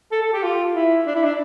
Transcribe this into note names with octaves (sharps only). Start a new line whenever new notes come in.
A4
A4
G4
F4
E4
D4
E4
D4